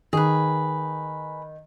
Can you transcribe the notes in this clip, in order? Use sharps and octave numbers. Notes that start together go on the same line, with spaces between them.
D#3 G#4 B4